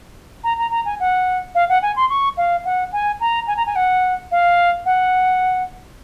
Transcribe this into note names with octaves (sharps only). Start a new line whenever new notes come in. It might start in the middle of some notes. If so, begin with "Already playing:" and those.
A#5
A#5
A#5
G#5
F#5
F5
F#5
G#5
C6
C#6
F5
F#5
G#5
A#5
G#5
A#5
G#5
F#5
F5
F#5